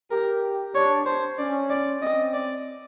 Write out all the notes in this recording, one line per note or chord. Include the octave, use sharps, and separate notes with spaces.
G4 A#4
D4 C#5
C5
C#4 D5
D5
C4 D#5
D5